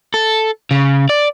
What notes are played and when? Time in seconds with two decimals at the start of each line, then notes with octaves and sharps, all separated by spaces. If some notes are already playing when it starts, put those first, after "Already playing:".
0.14 A4
0.71 C#3
1.09 D5